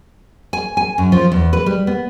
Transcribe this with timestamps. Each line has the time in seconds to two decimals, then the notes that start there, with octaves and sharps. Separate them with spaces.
0.53 G#5
0.77 G#5
0.98 F#2
1.12 F3
1.32 E2
1.53 B4
1.66 G3
1.87 B3